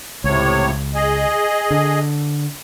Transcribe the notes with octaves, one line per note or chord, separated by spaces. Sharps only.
C#2 A2 C3 C#5
G#4 D#5
D3